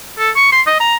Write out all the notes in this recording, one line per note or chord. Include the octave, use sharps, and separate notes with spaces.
A4
C#6
C6
D#5
A#5